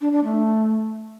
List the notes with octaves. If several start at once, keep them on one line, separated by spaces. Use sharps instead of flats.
D4
D4
A3